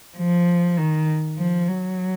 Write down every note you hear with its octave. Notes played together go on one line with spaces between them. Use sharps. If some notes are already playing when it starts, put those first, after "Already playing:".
F3
D#3
F3
F#3